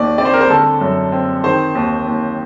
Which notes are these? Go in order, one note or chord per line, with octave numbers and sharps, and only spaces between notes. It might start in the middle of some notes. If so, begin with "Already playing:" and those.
Already playing: D#2 D#3 D5
C4 D5
C5
A#4
C5
D3 A4
F#2
C4
D#3 C5
D#2
D#2